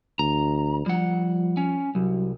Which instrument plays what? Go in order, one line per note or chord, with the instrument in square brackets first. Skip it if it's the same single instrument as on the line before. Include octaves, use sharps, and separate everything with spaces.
[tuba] D2 [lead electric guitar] A#5
[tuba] F3 [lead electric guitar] G3 F#5
[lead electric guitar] C#4
[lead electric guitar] C2 [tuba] F#3